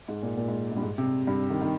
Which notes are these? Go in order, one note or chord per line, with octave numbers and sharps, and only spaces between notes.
G#2
A#2
A#2
G#2
G#2
G2
G#2
C3
G2
D#3
D#3